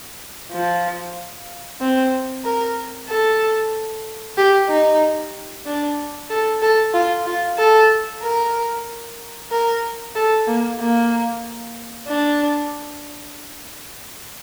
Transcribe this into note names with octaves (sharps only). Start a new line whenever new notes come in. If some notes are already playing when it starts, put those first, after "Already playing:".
F3
C4
A#4
A4
G4
D#4
D4
A4
A4
F4
F4
A4
A#4
A#4
A4
A#3
A#3
D4